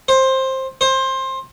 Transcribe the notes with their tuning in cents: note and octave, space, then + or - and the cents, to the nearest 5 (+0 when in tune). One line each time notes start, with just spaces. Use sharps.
C5 +15
C5 +20